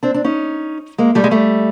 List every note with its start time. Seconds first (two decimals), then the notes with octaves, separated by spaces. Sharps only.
0.03 C4 D4
0.14 C4 D4
0.24 C#4 D#4
0.98 G#3 A#3
1.15 G3 A3
1.24 G#3
1.31 G3 A3